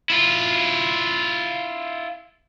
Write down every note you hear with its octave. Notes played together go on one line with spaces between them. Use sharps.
E4 F4